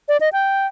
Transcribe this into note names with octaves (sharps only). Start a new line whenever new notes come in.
D5
D#5
G5